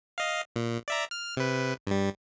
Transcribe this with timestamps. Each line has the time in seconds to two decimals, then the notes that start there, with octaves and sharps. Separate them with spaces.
0.18 D#5 F5
0.56 A#2
0.88 D5 E5 A#5
1.11 F6
1.37 C3 B4
1.87 G2 G3